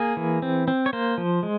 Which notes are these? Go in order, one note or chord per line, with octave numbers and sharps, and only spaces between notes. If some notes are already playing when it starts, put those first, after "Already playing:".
Already playing: A#3 G#4
E3
C4
C4
C#5
A#3 C5
F3
G#3